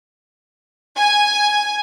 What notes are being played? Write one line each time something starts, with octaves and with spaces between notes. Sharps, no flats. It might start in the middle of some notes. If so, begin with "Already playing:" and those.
G#5